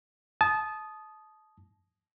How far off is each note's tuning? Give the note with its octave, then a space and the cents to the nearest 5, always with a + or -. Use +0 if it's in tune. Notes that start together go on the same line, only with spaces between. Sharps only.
A5 -25 D#6 +0